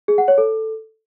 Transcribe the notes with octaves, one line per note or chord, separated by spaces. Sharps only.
G#4
F#5
C#5
A4